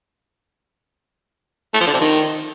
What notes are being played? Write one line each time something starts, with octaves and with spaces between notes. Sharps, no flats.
A3
F3
D3
C3
D#3